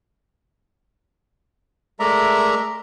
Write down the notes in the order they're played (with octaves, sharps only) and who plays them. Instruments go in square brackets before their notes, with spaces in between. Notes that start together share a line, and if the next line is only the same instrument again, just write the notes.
[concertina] G#3 A3 A#4 D5 E5 A#5